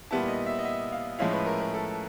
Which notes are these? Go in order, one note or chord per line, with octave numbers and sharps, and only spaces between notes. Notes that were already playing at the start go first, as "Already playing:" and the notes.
A#2 G3 B3 E4 A5
D#5
E5
D#5
E5
F5
A2 F3 G#3 C#4 E4 F5
B4
A#4
B4
A4